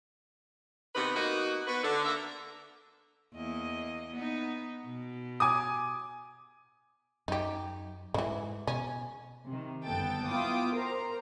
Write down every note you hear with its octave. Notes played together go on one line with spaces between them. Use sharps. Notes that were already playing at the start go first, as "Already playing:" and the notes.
C3 D#3 B3 D#4 B4
A#3 B3 D#4 F#4
B3 F#4 B4
D3
A#3 A4 A#4 E5
E2 A#3 D#5
B3 D#4
B2
G#5 D6 D#6
F#2 D#4 G4
G#2 D3 E3 G#3
B2 C#4
C3 D#3
G1 F#2 B3 A4 G5 A6
B3 E4 F4 G5 D6 D#6
A#4 C5 A#5